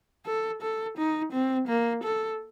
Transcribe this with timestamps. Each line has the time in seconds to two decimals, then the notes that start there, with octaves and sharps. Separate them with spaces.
0.26 A4
0.62 A4
0.97 D#4
1.32 C4
1.67 A#3
2.04 A4